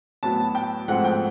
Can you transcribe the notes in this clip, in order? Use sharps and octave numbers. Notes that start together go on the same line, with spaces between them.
A2 F#3 B3 A5
G5
G#2 F3 A3 C4 F#5
G5